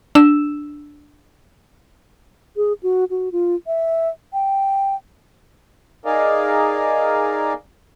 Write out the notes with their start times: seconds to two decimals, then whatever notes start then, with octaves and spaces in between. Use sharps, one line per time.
0.15 D4 E6 E7
2.57 G#4
2.83 F#4
3.10 F#4
3.32 F4
3.67 E5
4.33 G5
6.05 D#4 G#4 A#4 D5 D#5 F5